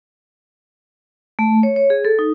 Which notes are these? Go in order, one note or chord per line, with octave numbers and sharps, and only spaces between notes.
A3
C#5
C#5
G#4
A4
D#4